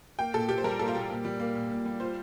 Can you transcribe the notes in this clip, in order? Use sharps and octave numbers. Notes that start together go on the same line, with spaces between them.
A#3 G5
A#2 A4
A#2 G4
C5
G3 A#4
A#3 A4
F4
A#2 G4
A#2
G3
A#3
A#2
A#2
G3
F4 C5